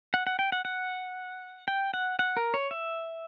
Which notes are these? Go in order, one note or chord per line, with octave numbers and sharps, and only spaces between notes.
F#5
F#5
G5
F#5
F#5
G5
F#5
F#5
A#4
C#5
E5